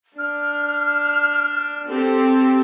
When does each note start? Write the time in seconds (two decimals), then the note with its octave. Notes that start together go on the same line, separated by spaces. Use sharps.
0.18 D4 F6
1.87 C4 G4 A4